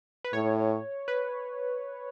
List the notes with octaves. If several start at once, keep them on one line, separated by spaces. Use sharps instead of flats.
B4
A2 C#5
B4